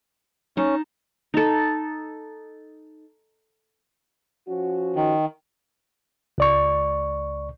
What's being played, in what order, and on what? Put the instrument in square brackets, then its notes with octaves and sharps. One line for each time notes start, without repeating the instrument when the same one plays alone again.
[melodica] C#4 [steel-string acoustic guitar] D#4 A5
[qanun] D#4 A4
[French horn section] F3 C#4 F#4
[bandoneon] D#3
[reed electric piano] C#2 D5 C#6